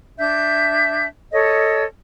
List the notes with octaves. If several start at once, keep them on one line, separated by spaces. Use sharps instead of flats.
D4 E5 G6
A4 C#5 D#5